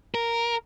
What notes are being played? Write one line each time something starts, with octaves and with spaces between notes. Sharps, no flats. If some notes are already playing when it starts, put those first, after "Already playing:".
A#4